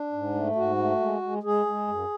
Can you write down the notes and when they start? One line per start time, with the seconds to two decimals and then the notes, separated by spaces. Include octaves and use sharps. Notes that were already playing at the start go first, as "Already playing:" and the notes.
Already playing: D4
0.13 G#2
0.35 A3
0.55 G#2 F#4
0.78 A3
1.00 G#3
1.22 G#3
1.43 G#3 G#4
1.66 G#3
1.88 F#2